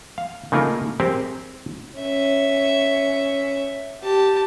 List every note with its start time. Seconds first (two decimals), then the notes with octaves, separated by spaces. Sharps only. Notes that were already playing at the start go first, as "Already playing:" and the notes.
0.18 F5
0.52 C#3 A3 A#3 D#4 F4 A#4
1.00 C4 G4 G#4 A#4 C5
1.99 C#4 E5
4.03 G4 A5